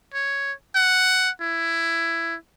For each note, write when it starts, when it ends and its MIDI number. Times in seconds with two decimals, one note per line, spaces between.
0.14 0.53 73
0.76 1.30 78
1.41 2.36 64